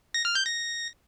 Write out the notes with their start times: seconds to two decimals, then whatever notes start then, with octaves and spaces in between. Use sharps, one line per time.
0.14 A#6
0.25 F6
0.35 G6
0.46 A#6